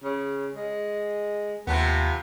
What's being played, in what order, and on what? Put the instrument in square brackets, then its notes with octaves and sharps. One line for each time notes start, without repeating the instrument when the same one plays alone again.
[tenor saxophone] C#3
G#3
[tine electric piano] D#2 [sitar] C3 F3 B3 [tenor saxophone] B4